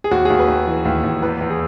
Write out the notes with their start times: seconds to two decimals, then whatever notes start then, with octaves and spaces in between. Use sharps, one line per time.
0.04 G#4
0.11 D#2 F#4
0.25 D#2 G#4
0.39 B4
0.48 D#2
0.67 E3
0.85 D#2
1.04 D#2
1.22 E2 B4
1.41 E2
1.50 G#4